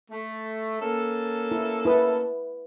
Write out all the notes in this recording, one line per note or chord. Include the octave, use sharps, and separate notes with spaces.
A3
A#3 C#4 A4
E4
E4 B4 D#6